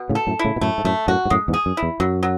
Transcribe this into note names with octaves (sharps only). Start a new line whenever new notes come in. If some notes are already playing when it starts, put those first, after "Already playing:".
Already playing: B2
A2 C#3
A4
F#2 A2
E4
A2 C#3
B2
F#2 A2 A3
G#2
F#2 A2 A3
F#2 A2 F#4
G#2
F#2 A2 G#3
E2 G#2
G#4
F#2
E4
E2
F#2 F#3
F#3